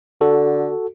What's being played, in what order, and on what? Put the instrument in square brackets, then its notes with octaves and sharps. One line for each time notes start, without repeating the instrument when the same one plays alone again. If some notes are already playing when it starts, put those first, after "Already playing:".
[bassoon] D3 [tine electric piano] F#4 A4